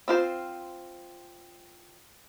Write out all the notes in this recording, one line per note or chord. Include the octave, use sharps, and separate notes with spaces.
C4 F4 C5